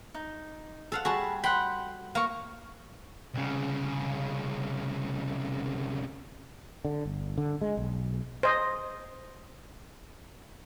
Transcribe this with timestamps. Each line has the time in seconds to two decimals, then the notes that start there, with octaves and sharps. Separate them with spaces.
0.14 D#4
0.92 A4 F5 F#5
1.05 G3 F#4 G#4 A5 B5
1.44 F#5 G5 B5 C6
2.15 A#3 F5 C#6
3.34 C2 C#3
6.85 D3
7.06 G1
7.38 D3
7.61 G#3
7.77 B1
8.43 C5 D#5